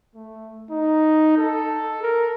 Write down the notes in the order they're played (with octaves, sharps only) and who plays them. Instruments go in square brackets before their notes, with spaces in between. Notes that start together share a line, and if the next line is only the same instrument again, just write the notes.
[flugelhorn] A3
D#4
A4
A#4